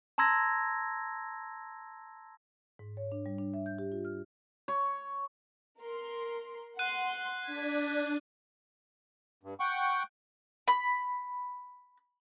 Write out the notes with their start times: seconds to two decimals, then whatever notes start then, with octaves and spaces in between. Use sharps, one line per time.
0.18 A5 A#5 C6 E6 G#6 A#6
2.79 G#2
2.97 C#5
3.12 D4
3.26 G3
3.39 D4
3.54 E5
3.66 G6
3.79 G4
3.92 F4
4.05 F6
4.68 C#5
5.81 A#4 C6
6.79 F#5 C6 F#6 D#7
7.46 D4 G#6 B6
9.43 G2
9.60 F#5 G5 C#6
10.68 B5